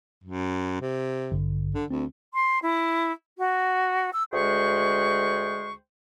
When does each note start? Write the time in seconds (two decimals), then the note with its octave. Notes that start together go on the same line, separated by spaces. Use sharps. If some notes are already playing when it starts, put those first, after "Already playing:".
0.24 F#2
0.81 C3
1.32 A1 G2 D3
1.75 D3
1.91 D2 C4
2.33 C6
2.62 E4
3.38 F#4
4.13 E6
4.33 D2 G#3 G#4 C5 G5 C#6